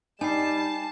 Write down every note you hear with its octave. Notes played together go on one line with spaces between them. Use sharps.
G3 D#4 G#5 A5 C7 E7